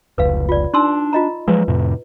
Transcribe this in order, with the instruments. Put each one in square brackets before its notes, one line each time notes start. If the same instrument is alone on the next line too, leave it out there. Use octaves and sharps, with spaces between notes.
[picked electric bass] F1 C#2 [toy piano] B4 F5
[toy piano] F4 D5
[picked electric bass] D4 [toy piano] D#4 C6 E6
[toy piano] F4 D#5 A#5
[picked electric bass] F3 F#3 G#3 [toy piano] B4
[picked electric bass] F2 A2 C3